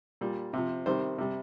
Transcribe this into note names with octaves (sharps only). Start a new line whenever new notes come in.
A#2 G3
C3 F3
C3 D#3 G3 C5
C3 G3